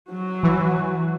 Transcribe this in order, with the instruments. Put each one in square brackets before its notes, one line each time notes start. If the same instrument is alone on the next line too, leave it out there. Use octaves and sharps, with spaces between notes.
[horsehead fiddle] F#3 F#4
[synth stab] E3